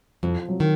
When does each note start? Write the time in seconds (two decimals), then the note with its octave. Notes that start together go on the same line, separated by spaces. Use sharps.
0.23 F2 F3
0.48 F#3
0.60 D#3